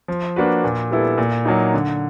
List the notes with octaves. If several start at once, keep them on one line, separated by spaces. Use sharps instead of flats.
F3
A#3 D4 F#4 B4
A#2
G3 B3 E4 A4
A#2
F#3 A#3 D#4
D3